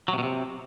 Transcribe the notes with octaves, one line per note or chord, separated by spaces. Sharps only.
F#3
C3
B2
C3